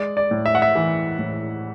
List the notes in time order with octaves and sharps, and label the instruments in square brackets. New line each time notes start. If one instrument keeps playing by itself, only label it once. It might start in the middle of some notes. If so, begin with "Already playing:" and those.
Already playing: [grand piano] G#3 D5
D5
A2
E5
F#5
E5
E3
A2